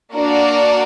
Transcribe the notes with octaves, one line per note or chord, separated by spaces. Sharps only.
A#3 D4 F#4 A#4 D5